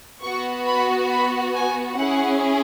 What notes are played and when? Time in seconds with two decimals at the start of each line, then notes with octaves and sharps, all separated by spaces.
0.22 B3 F#4 C#6
0.66 B5
1.10 B5
1.55 G#5
1.97 C#4 E4 G#4 F#5